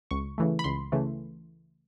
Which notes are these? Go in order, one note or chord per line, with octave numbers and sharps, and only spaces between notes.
C#2 C#6
C#3 E3 A3
B5
C#2 C6
C#3 E3 A3